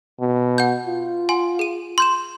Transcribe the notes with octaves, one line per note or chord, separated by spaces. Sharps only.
B2
F#5 G6
F4
F#5 G#5 C6
G#4 D#7
C6 G6 E7